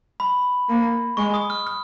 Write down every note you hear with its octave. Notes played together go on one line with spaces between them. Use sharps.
B5
A#3
G#3 C#6
D#6
F6
F6